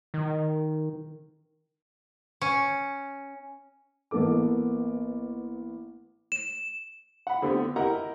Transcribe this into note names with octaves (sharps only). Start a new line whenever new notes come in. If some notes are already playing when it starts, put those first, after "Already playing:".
D#3
C#4
A1 A#3 B3 A4 D6
E7
F#5 B5
D3 A3 B3 C4 G4
E4 G4 A#4 D#5 F#5 A#5